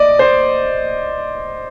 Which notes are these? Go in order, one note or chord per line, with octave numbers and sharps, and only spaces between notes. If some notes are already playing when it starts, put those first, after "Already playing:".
Already playing: D5 D#5
C5